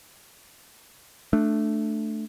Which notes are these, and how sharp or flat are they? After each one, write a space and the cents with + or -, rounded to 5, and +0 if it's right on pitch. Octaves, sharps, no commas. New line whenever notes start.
A3 +0 D4 +10